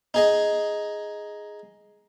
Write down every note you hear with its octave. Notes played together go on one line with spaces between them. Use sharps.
D#4 G#4 D#5